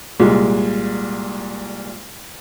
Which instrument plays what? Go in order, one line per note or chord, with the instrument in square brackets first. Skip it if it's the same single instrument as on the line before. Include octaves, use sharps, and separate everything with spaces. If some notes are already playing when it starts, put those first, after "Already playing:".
[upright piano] C2 A#2 G#3